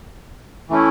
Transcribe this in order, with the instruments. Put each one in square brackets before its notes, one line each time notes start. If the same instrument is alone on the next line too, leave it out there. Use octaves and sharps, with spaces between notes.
[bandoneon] E3 A3 C#4 E4